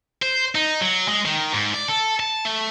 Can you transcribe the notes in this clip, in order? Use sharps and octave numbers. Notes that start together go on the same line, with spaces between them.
C5
D#4
F#3
G#3
D#3
G#2
D5
A4
A5
A3